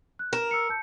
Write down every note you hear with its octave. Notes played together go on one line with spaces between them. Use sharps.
F#6
A#4 E7
E6 C#7
A5 G6 C#7